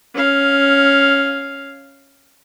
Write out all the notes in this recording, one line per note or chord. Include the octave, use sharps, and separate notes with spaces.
C#4 F5